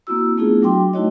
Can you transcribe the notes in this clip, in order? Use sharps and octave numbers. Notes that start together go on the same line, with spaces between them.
A#3 C4 E4 F#4 E6
A3 B3 D4 E4 F4 G#4
F#3 D4 F#4 G5 C6 D6
A3 D#4 E4 F#4 C#5 D#5